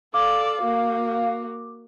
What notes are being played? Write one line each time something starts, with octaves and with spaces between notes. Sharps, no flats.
A4 D5 F5 D6
A#3 F#4